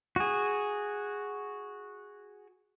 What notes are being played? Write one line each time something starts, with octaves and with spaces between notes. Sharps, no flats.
F#4 G#4